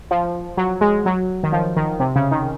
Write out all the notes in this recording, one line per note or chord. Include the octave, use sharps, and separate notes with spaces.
F3
F#3
G#3
F#3
D#3
F3
D#3
C3
C#3
D#3